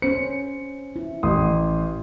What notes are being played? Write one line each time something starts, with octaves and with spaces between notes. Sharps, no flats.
C#4 C5 C#7
E4
A1 C6 D#6